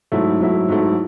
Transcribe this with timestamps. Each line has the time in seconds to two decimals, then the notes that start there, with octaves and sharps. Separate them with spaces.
0.12 G#2 F#3 A3 E4
0.39 G#2 F#3 A3 E4
0.68 G#2 F#3 A3 E4